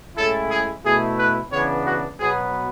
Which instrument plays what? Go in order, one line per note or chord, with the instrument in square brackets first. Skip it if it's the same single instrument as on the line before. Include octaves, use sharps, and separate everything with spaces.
[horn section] A2 G#3 C#4 E4 A4
G#4
B2 A3 E4 G#4
B4
C#3 E3 B3 D4 C#5
F#4
B2 F#3 B3 G#4